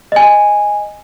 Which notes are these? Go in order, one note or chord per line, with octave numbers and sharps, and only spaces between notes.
D#5 G#5